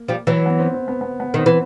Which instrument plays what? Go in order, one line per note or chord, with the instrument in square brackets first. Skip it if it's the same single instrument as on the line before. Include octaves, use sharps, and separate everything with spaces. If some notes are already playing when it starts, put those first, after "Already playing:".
Already playing: [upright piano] A#3
[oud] F3 G3
E3 F#3
[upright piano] B3
C4
C4
B3
B3
B3
[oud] D#3 [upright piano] C4
[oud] E3